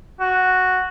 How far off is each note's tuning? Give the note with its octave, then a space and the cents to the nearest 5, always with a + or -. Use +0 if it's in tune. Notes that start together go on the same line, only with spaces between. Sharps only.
F#4 +0